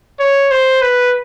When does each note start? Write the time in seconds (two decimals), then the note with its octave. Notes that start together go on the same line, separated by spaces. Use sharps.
0.20 C#5
0.51 C5
0.82 B4